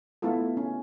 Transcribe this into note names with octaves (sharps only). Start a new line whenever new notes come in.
A3 B3 E4 F4 A4
C#4